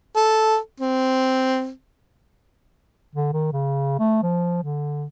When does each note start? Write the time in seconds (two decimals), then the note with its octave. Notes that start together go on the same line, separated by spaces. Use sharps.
0.16 A4
0.80 C4
3.15 D3
3.33 D#3
3.52 C#3
3.99 A3
4.23 F3
4.63 D3